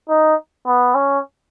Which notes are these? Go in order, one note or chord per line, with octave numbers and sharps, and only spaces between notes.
D#4
B3
C#4